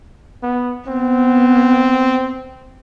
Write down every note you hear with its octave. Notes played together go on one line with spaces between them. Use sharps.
B3
B3 C4